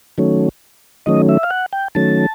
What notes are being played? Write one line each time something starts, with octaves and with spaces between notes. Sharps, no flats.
D#3 F#3 A3 C#4
D#3 F#3 A3 C#4 D#5
E5
F5
F#5
G5
D#3 F#3 A3 C#4 A5